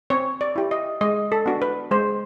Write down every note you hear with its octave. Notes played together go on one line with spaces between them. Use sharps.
C4 C#5
D5
E4 G4
D#5
G#3 D#5
A4
B3 D4 F#4
B4
G#3 C5